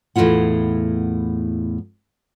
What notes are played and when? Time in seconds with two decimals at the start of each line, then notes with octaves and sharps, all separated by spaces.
0.16 E2 A2 G#3 E4 F4 F#5